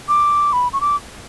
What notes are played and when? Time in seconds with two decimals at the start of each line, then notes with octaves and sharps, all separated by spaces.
0.08 D6
0.53 B5
0.73 C#6
0.81 D6